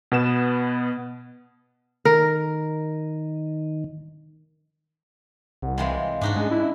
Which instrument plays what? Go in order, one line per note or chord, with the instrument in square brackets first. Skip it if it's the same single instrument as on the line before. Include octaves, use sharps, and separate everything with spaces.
[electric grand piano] B2 B3 E7
[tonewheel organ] D#3 [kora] A#4
[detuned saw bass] C2 [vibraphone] F#5
[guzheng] C3 E3 G#3 [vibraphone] F5 C6
[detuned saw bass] G#2 [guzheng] D4 D#4 F#4
[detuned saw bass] G#3 [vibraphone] C#4
[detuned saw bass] E4